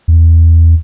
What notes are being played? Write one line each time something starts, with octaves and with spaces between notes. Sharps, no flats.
E2